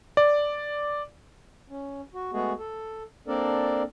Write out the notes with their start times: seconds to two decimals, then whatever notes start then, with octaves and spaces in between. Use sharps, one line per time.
0.17 D5
1.70 C#4
2.14 F#4
2.33 G#3 A3 B3 F#4 G#4
2.58 A4
3.27 A#3 C4 D4 A4 A#4 D5